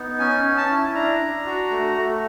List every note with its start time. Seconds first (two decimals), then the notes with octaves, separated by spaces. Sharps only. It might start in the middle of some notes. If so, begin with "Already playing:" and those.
Already playing: B3 D#4
0.19 C#4 G#5
0.44 C#4
0.57 A5
0.70 E4
0.94 D4 A#5
1.20 D4
1.46 F#4
1.71 A3
1.96 A3